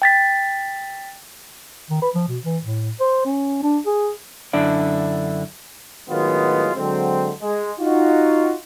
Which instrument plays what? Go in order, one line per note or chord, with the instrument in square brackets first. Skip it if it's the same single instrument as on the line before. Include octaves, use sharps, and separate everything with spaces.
[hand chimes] G5 A6 B6
[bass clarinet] D#3
B4
F3
B2
E3
A2
C5
C#4
D4
G#4
[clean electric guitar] F#2 D3 D4 E4 D5
[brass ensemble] A2 D#3 F#3 G#3 B3 F4
D3 F#3 G#3 C4
G#3
D#4 F4 F#4